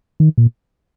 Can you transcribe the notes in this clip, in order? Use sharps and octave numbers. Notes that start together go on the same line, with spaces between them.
D#3
A#2